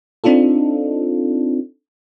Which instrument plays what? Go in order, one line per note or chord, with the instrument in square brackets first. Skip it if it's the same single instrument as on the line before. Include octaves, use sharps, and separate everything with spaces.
[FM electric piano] C4 D4 D#4 F4 A4